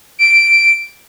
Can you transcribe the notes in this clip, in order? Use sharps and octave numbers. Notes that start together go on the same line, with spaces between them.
D7